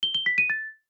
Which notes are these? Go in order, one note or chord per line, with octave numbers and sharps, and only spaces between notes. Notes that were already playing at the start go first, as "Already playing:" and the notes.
G7
G7
B6
D#7
A6